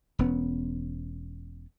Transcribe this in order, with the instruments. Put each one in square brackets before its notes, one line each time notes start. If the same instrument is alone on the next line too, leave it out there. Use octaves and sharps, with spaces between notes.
[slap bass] E1 B3 C#4